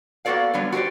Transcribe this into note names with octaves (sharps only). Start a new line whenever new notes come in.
A#3 B3 F#4 A4 D5 F5
D3 F#3 G3 B3 C#5
F#4 G4 A#4 C5 D5